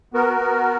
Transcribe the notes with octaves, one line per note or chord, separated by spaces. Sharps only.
B3 F#4 A#4
B3